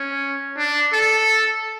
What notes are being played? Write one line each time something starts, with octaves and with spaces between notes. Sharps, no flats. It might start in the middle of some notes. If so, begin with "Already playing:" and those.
Already playing: C#4
D4
A4